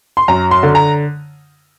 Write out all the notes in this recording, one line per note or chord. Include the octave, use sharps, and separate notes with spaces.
C6
F#2 A#5
C6
D3
A#5